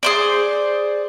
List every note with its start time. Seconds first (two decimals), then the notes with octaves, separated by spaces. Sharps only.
0.03 G#4 C5 D5